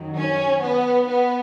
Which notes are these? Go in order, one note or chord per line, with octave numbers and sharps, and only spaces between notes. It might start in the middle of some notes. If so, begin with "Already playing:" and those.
Already playing: F#2 D#3 F#3
C#4
B3
B3